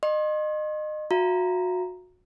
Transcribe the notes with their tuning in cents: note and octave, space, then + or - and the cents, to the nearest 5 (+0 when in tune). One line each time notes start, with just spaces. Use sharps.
D#5 -30 C6 +40
F#4 -25 E5 +45 A#5 +0